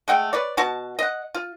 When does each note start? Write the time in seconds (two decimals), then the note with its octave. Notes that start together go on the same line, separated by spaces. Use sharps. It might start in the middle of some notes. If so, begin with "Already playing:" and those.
0.08 G#3 A3 F#5 G5
0.33 B4 C#5 D5
0.57 B2 F#4 A5
0.99 D#5 F#5
1.34 F4